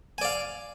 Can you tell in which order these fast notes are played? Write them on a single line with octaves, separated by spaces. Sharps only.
G#5 D5 F5